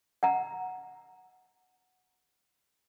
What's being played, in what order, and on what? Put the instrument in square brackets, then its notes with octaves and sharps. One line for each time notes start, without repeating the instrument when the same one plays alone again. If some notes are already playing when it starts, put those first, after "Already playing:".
[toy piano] F#5 A#5